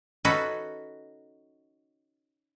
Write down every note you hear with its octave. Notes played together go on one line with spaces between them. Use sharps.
C#4 D#4 F#4 A4 B4